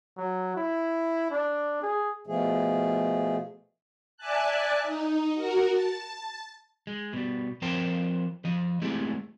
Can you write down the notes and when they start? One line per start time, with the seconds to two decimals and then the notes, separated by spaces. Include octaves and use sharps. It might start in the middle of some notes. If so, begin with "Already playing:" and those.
0.17 F#3
0.56 E4
1.30 D4
1.82 G#4
2.27 B2 F3 A3 G#4
4.17 D5 E5 G#5 A5 F#6
4.83 D#4
5.34 F#4 A#4
5.71 A5
6.87 G#3
7.13 B2 G3
7.62 F3 C4 A#4 C5 G5 A5
8.45 F3 D#5
8.82 G#3 A3 C4 E4 G4 G#4